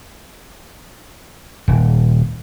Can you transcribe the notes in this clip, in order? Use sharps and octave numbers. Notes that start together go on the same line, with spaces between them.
D#1